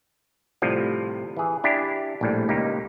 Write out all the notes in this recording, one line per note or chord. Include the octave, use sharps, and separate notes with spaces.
A2 C3 F3 G3
E3 G#4
D4 E4 G4
A#1 A2 G3
C#2 A#3 D#4 G4